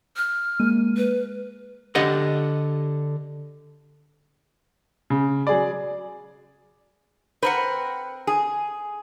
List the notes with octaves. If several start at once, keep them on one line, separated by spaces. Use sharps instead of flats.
F6
G#3 A#3 D#7
B4
D3 G4 D#5 F#5
C#3
F#3 G#4 D5
C4 A#4 B4 F#5
G#4